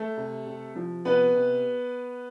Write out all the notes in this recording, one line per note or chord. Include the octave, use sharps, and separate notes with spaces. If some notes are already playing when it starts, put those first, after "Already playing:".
Already playing: A3 A4
C3
C3
F3
C3 B3 B4
C3